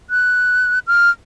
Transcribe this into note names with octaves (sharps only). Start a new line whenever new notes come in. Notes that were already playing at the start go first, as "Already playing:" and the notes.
F#6
F6